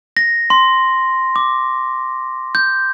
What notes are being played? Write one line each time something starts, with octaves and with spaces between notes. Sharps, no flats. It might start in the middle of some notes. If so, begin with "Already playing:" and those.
A#6
C6
D6
G6